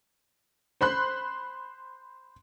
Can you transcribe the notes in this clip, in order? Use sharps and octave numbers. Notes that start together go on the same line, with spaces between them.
C5 B5 C6 F#6